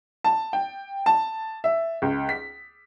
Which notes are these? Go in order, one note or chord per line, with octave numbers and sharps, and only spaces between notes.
A5
G5
A5
E5
C#2
B6